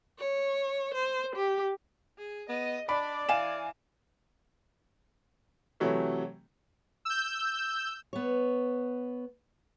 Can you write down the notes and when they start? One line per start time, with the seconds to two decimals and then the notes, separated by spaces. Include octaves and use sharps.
0.19 C#5
0.94 C5
1.36 G4
2.18 G#4
2.49 B3 D#5
2.89 D4 D5 B5
3.29 E3 F5 G#5 E7
5.80 C3 E3 F#3 A3
7.05 E6 G6
8.13 B3 C#5